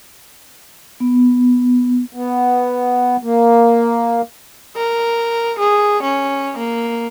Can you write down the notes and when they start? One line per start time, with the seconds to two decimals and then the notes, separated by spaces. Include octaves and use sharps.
1.00 B3
2.14 B3
3.23 A#3
4.76 A#4
5.58 G#4
6.02 C#4
6.57 A#3